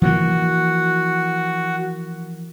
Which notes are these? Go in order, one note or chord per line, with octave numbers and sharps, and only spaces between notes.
E3 F3 A#3 F#4